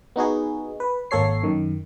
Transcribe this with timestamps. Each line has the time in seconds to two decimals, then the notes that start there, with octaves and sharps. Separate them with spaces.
0.16 B3 D#4 F#4 G#4
0.80 B4
1.11 G#1 A#3 A4 C#5 C7
1.43 F#2 D#3